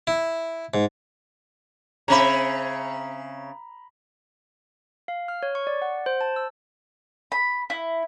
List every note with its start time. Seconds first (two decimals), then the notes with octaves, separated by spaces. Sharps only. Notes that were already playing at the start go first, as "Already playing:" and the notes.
0.07 E4
0.74 G#2
2.08 C#3 C4 E5 A#5 B5
5.08 F5
5.28 F6
5.43 C#5
5.55 C#6
5.67 D5
5.82 F#5
6.06 C5
6.21 A5
6.36 E6
7.32 B5
7.70 E4